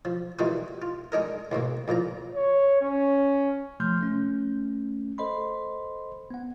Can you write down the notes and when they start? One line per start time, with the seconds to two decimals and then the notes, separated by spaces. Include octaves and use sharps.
0.05 F3
0.39 E3 G3 A#3 D#4 F4 F#4
0.82 F4
1.12 G#3 D4 D#4 A#4
1.52 D#2 G#2 B2 A#3
1.88 E2 A#2 F3 A#5
2.35 C#5
2.81 C#4
3.80 C3 F3 A3 C6 F6 G6
4.01 A3 C#4
5.18 A4 C5 D#5 B5 C6
6.31 B3 F#5